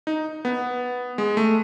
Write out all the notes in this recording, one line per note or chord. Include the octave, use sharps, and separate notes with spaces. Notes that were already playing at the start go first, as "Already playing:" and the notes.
D#4
B3
G#3
A3